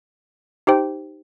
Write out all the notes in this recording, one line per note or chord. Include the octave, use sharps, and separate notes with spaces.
D#4 G4 C5 G5